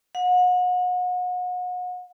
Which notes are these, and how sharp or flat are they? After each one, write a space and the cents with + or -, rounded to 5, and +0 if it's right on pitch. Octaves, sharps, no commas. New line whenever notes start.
F#5 -35